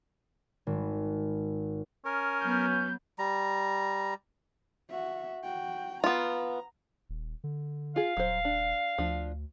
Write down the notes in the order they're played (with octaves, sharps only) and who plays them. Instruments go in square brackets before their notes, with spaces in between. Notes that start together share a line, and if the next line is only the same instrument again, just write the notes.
[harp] G#1
[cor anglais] C#4 [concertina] A#4
[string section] F#3 B3 [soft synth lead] G6
[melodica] G3 A#5
[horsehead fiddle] F#4 E5
F#4 G5
[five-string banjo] B3 F4 [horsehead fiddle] A#5
[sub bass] D#1
D3
[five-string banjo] F4 G#4 [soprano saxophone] F5
[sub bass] D#1 [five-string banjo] F#3 C5
[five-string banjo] D4
[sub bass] D2 [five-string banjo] F3 D4